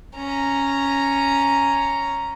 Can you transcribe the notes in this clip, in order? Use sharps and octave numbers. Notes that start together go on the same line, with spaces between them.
C#4 A#5